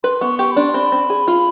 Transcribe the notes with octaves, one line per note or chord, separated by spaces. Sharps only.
B4 C6
B3 C#6
G4 C#6
B5
D4 C6
C4 B5
C4
G#4
F4